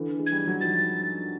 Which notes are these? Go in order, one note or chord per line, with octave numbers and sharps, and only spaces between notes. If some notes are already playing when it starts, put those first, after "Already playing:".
Already playing: D3 E3
G#3
G#6
G3
F#3
D#3 F3 A6